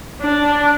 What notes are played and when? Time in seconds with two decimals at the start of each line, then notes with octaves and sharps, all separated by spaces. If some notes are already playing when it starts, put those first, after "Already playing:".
0.21 D4